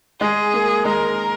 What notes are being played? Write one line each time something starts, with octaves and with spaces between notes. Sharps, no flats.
G#3 G#4
A#3
G#3 A#4